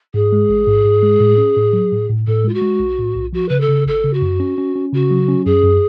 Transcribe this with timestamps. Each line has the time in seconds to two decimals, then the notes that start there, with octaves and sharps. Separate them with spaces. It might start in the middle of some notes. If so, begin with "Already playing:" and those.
0.14 G#2 G#4
0.32 G#3
0.49 A1
0.67 G#2
0.85 G#2
1.03 G#3
1.20 A2
1.38 C#4
1.56 A2
1.73 F#3
1.92 A2
2.10 A2
2.27 A2 A4
2.44 G#3 F4
2.54 F#4
2.62 G#3
2.80 B1
2.98 A2
3.15 B1
3.33 F3 F#4
3.48 C#3 B4
3.60 A4
3.68 C#3
3.86 G#1 A4
4.04 C#3
4.13 F#4
4.22 F#2
4.40 C#4
4.58 C#4
4.76 C#4
4.93 C#3 F#4
5.11 F#3
5.28 C#4
5.45 F#2 G#4
5.63 F#2